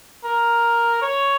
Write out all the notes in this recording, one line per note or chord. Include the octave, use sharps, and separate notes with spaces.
A#4
C#5